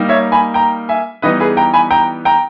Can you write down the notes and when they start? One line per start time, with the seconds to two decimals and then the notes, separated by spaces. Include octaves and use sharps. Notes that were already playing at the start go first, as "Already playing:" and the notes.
Already playing: G3 A#3 D#4
0.09 C#5 E5
0.32 G#5 B5
0.54 G5 A#5
0.89 E5 G#5
1.22 E3 G3 B3 D#4 B4 D#5
1.40 G#4 B4
1.57 G5 A#5
1.74 G#5 B5
1.91 G5 A#5
2.25 G5 A#5